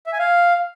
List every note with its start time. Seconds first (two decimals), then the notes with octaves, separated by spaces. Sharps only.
0.06 E5
0.13 G#5
0.19 F5